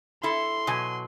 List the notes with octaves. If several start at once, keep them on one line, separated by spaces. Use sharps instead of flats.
E4 A4 C6
B2 F#3 G#5